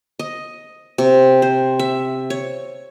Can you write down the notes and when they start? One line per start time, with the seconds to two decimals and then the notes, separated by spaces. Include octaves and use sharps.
0.19 D#5
0.98 C3
1.42 C5
1.79 E5
2.30 C#5